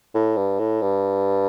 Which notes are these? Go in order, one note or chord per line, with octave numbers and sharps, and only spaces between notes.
A2
G2
A2
G2